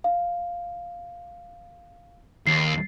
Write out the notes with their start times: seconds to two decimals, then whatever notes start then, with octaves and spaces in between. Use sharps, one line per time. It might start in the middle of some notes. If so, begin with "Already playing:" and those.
0.04 F5
2.47 D#2 C7